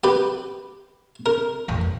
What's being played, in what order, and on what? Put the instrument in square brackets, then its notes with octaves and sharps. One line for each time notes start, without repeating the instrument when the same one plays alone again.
[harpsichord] G4 B4
A#4
[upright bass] A1 F2